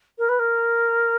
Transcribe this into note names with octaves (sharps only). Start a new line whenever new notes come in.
A#4
B4
A#4